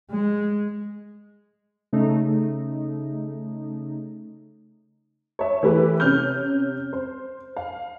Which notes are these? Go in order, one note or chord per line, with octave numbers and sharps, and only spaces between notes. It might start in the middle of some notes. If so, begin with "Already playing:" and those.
G#3
C#3 A3 D#4
C#5 E5
E3 A3 E4 G4 B4
C3 C#4 F6 G6
C5
F5